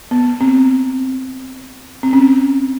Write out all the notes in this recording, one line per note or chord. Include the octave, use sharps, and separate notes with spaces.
B3
C4
C4
C#4